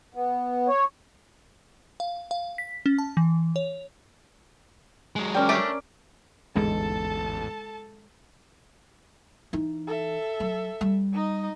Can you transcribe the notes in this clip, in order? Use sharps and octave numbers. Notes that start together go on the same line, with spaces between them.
B3
C#5
F5
F5
B6
C#4
A5
E3
C#5
F#3 G#3
C#4 A#4 D5 G5
A3 D4 G4 D7
A1 E2 G#2 D3 G#3 A4 A5
E3 D#4
A4 E5
F#3
G3
D#4 D#5